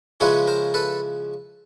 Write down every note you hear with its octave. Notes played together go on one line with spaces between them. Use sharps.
C#3 F3 G#3 C#4 E4 B4 C#5
A#4 C5
A4 B4